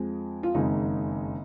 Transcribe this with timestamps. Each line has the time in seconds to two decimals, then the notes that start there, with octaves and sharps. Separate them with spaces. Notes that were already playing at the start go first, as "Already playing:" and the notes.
Already playing: F2 F3 G#3
0.43 F4
0.54 F#1 F2 D#3 G#3 D#4